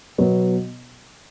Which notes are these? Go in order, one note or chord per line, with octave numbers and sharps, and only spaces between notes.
B2 F#3 B3